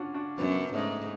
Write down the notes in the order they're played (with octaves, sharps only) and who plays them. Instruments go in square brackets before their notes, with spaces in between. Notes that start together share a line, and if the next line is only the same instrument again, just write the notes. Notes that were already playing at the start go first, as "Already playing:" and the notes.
Already playing: [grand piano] C#4 D4 F4 F#4
D4 F#4
[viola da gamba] F#2 [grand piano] B3 D4
[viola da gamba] G#2 [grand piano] A3 C#4